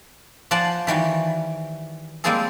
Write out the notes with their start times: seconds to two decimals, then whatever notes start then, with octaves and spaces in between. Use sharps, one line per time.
0.51 F3 C5 D5 F#5 G#5 A5
0.87 D#3 E3 G3 F#4
2.24 G3 G#3 A#3 C4 G#4 A4